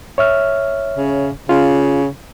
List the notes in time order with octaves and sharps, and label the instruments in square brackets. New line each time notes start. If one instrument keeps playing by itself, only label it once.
[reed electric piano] C#5 E5 F6
[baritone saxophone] C#3
[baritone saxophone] C#3 [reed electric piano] F4